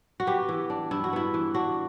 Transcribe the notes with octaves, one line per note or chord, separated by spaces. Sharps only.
F#4
B3 G4
E3
D4
G2 E4
F#4
B3 E4
E3
D4 F#4